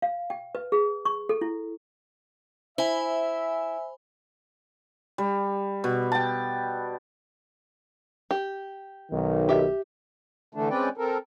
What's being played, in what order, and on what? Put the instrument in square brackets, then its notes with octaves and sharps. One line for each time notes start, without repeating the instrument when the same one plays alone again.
[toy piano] F5
G5
B4
G#4
C#6
A4
E4
[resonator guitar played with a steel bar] E4 [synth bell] C5 G#5 [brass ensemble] E5
[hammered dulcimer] G3
B2
G5 A5
[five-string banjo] G4
[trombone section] B1 D#3
[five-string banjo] G4 E5
[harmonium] D3 E3 A3 D4
G#3 C4 C#4 B4 D5 G5
C4 A4 A#4